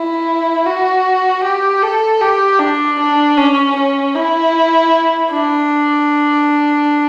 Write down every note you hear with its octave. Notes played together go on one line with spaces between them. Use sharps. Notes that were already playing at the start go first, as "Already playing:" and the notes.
Already playing: E4
F#4
G4
A4
G4
D4
D4
C#4
C#4
E4
D4